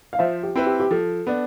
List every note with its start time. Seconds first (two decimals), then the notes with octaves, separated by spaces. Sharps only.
0.13 F5
0.19 F3 C5 E5
0.43 G4
0.56 C4 E4 B4
0.66 G4
0.80 G4
0.91 F3 A4
1.27 B3 D4